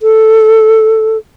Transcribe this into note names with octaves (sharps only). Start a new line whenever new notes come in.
A4